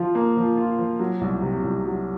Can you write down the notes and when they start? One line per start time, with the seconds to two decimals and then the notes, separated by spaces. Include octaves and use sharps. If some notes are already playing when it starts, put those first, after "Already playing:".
Already playing: F3 F4
0.15 A#3
0.37 F3
0.57 F4
0.78 F3
0.99 F#3
1.21 C2
1.42 C3
1.64 C2
1.85 F#3